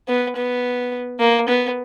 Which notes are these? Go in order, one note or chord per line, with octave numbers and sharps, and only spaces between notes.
B3
B3
A#3
B3